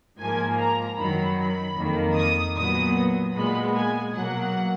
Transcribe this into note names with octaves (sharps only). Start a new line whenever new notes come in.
G#2 F3 A#3 G#5
A#5
F#2 D#3 F#3 B5
B5
F2 D#3 A#3
D#6
A#2 F#3 B3 D#6
A#2 G#3 B3 B5
G#5
B2 F#3 A#3 F#5